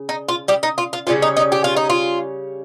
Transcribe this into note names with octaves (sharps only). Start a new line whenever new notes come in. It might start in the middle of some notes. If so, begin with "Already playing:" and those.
Already playing: C#3
D#4
F4
G3 G4
D#4
F4
F4
C#3 G3 C#4 F4
D#4
D#4
G4
F4
D#4
F4